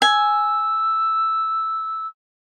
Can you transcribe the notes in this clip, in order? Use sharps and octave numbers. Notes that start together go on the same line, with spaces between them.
G#5 E6